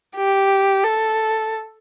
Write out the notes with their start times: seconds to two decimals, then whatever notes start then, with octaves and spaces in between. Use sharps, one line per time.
0.17 G4
0.84 A4